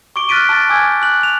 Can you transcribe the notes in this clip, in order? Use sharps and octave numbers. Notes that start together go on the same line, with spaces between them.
C#6 D6 D7 G7
F6 F#6 A6 B6 D7 D#7
A5 A6
G#5 D6 E6 G6 G#6
F#6 F#7
F7